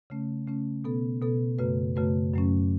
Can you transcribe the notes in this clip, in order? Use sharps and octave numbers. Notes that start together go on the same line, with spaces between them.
C#3 A3 C#4
C#3 A3 C#4
B2 B3 A4
B2 B3 A4
F#2 C#3 A3 F#4 B4
F#2 C#3 A3 F#4 B4
F#2 F#3 A3 C#4